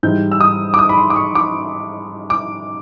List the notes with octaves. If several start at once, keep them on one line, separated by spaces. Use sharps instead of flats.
G#2 E3 G3 G6
E6
D#6
D6
D#6
B5
C6
D6
C#6
D6
D6